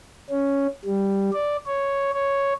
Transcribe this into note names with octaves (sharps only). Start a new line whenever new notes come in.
C#4
G3
D5
C#5
C#5